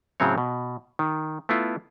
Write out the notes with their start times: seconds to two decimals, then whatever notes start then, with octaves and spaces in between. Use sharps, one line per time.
0.20 A2 C#3 F#3 C4 C#5
0.38 B2
0.99 D#3
1.49 A3 B3 E4 F4